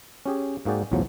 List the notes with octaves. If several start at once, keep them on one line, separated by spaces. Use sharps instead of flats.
C#4 G4 G#4
G#2 A#3 F#4 G#4 D5 G5
B1 E2 A2 F3 F#3